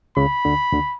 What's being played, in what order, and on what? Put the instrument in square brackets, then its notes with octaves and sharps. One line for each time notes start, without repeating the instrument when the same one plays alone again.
[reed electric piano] C#2 C#3 [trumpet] B5
[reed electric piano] D2 D3
D2 D3